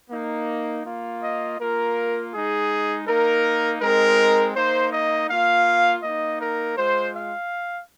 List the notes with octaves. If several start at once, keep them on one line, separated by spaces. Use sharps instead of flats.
A#3 D#4
A#3 F4
D#5
A#3 F4 A#4
G#3 D#4 G#4
A#3 D#4 A#4
G#3 C4 D#4 A#4
A#3 D#4 C5
D#5
A#3 F4 F5
A#3 D#4 D#5
A#4
G#3 F4 C5
F5